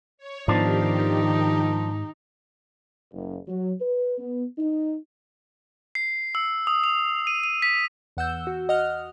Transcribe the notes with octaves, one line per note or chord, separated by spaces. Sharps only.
C#5
G#2 D#3 F3 B3 D4 D#4 G4
F#1
F#3
B4
B3
D#4
C7
E6
D#6
F7
D#7
D#7
B6
E2 F#5 E6 G6
F#4
D#5 F#5 F6